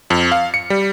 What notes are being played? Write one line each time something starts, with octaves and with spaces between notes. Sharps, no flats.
F2
F5
C#7
G3